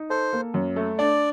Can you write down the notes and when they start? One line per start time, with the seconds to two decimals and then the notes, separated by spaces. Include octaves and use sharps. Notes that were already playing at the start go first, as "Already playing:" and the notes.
Already playing: D#4
0.10 A4 C5
0.33 A#3
0.54 F#2
0.76 A3
0.99 D4 D5